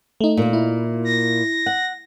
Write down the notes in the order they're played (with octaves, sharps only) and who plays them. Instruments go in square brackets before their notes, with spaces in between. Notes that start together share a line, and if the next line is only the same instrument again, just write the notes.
[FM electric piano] A3 D#4
[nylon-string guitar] A#2 A#3
[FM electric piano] E4
[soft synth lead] A#6
[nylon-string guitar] F#5